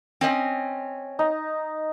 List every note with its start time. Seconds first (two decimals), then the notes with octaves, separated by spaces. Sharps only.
0.21 C4 C#4 D#5
1.19 D#4